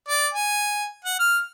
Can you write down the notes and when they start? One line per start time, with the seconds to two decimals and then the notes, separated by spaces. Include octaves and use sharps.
0.08 D5
0.34 G#5
1.04 F#5
1.19 F6